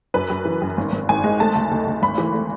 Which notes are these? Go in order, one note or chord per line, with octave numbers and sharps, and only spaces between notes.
F#2 B4
F#2
E3
F#2
G#1
G#1
G#1 G#5
G#3
A3 A5
D2
D2
D2
G#1 B5
E3
A3